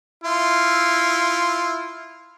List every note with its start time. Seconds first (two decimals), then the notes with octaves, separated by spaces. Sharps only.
0.24 E4 F4